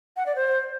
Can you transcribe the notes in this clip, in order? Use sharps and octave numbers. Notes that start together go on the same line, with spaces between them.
F#5
D5
C5